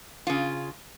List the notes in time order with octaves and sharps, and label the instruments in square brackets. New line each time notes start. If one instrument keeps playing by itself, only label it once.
[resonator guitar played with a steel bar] C#3 F4